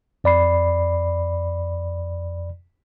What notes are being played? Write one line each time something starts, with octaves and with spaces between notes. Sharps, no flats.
F2 D5 B5 C7